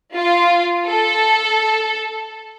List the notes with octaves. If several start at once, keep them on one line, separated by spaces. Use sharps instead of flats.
F4
A4